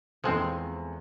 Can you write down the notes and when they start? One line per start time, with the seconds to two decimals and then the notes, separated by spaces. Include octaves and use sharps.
0.24 E2 F3 G#3 C4 A4